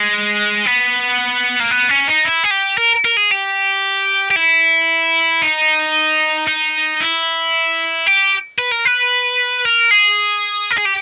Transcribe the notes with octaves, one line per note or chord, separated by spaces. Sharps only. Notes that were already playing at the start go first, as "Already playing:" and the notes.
Already playing: G#3
B3
A#3
B3
C#4
D#4
E4
G#4
G4
A#4
A#4
G#4
G4
G4
E4
D#4
D#4
E4
G4
B4
A#4
B4
A#4
G#4
A#4
G#4
G4